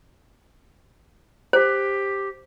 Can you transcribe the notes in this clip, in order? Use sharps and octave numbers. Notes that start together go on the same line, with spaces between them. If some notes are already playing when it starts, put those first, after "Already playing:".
G4 C5